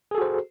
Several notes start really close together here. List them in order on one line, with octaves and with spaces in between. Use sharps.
G#4 A4 F#4 C5